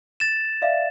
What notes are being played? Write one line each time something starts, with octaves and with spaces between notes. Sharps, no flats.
A6 E7
D5 E5 F5